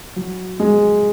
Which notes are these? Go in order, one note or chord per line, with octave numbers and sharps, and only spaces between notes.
F#3
G#3